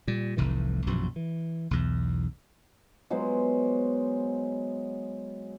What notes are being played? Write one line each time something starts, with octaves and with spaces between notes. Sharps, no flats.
A#2 G3
F1 C2 A2 E3
A#1 F#2 B2 E3
E3
B1 E2
F#3 G#3 B3 C5